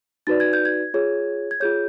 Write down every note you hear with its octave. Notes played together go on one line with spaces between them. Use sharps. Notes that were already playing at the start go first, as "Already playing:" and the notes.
D#4 F#4 B4 D5 A6
G#6
G6
G#6
F4 G#4 C#5
G#6
F4 G#4 C#5 G6